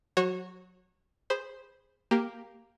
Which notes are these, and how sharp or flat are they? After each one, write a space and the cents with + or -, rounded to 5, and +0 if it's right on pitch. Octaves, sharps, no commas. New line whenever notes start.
F#3 -20 F#4 +0 C#5 -30
G#4 -15 C5 +0 B5 +0
A#3 +0 G4 +0